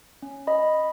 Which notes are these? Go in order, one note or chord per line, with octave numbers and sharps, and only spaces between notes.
C#4
D#5 B5